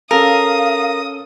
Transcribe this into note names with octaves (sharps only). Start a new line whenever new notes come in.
C#4 A4 A#4 F5 D#6